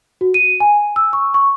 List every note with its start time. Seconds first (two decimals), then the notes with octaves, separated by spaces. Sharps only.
0.21 F#4
0.34 D#7
0.60 G#5
0.96 E6
1.13 C#6
1.34 C#6